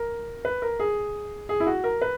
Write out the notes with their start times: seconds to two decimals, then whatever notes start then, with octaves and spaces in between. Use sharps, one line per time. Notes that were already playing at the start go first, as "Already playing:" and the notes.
Already playing: A#4
0.45 B4
0.62 A#4
0.80 G#4
1.49 G#4
1.60 E4
1.67 F#4
1.84 A#4
2.02 B4